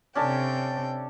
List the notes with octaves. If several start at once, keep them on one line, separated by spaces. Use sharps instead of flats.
C3 C#4 D4 A4 G5